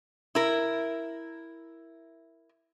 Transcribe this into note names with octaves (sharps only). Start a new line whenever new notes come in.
E4 A#4